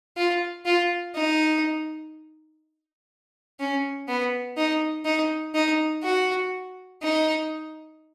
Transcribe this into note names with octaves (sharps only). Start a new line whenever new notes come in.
F4
F4
D#4
C#4
B3
D#4
D#4
D#4
F#4
D#4